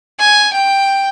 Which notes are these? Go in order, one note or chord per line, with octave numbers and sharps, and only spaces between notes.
G#5
G5